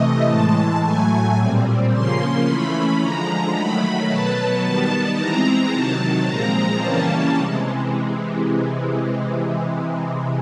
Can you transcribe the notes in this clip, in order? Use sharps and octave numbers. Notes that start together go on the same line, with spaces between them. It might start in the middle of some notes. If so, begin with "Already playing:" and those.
Already playing: C3 E3 A3 D#5
A2 E3 G#3 A5
A2 F#3 A3 G#5
A#2 G3 C4
C#3 F3 A#3 C#4 C6
E3 A3 C#4 B5
D3 F3 G#3 A#5
D#3 F#3 A3 B5
B2 F#3 B3 A5
D#3 G3 B3 A5
E3 G#3 C4 A#5
C3 D#3 F#3 A5
A#2 F3 G#3 C4 A#5
C#3 E3 G3 A#3 C#4 A5
C3 E3 G#3